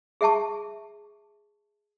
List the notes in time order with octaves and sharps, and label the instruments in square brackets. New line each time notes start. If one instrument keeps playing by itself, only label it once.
[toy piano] G#4 E5 G5 A5 C#6